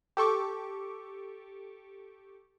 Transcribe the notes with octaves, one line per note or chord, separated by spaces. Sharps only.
G4 A4 C#6 D6